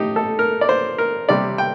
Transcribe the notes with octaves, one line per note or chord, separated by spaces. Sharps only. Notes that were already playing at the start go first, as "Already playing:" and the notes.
Already playing: A2 D#4 G4
A4
A#4
D5
C5
A#4
C3 G3 D5
G5